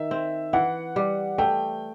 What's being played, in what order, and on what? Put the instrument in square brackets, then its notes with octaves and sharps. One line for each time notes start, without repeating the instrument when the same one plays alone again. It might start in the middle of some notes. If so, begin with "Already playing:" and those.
Already playing: [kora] D#3 [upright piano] E5
[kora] C4
[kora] E3 [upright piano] F#5
[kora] G3
[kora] A3 [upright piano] G5